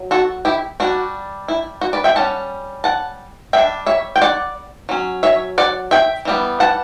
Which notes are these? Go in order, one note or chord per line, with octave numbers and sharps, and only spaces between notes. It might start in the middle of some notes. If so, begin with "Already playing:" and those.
Already playing: F#3
F#4 A4
E4 G4
G3 D4 F#4
E4
F#4
B4 D5
E5 G5
G3 C#4 F#5 A5
F#5 A5
G3 D4 E5 G5
C#5 E5
G5
D5 F#5
F#3 C#4
C#5 E5
D5 F#5
E5 G5
E3 G3 B3
F#5 A5